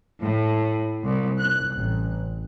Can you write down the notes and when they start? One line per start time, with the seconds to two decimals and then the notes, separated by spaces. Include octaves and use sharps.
0.21 A2
1.03 C2
1.39 F#6
1.77 A1